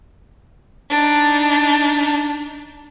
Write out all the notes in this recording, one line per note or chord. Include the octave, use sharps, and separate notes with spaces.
D4 D#4